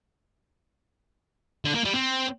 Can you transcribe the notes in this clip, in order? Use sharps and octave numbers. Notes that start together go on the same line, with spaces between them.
D3
A#3
G3
C4